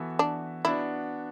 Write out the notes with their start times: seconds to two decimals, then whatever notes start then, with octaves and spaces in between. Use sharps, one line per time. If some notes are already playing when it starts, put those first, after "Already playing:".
Already playing: E3 B3 F#4 A4 E5
0.19 D4
0.65 B3 D4 E4 F#4